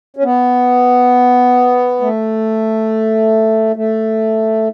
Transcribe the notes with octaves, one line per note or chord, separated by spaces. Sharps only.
C#4
B3
A3
A3